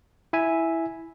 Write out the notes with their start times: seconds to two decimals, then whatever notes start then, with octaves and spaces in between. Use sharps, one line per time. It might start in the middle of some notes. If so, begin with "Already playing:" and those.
0.33 E4 E5 G#5